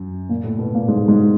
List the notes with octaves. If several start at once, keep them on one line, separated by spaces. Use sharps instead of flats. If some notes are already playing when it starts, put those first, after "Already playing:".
Already playing: F#2
A#2 A#3
A2 A3
B2 B3
A#2 A#3
G#2 G#3
G#2 G#3